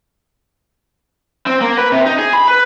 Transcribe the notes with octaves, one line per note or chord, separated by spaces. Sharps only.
C4
A#3
B4
C3
D#4
G#4
B5
B4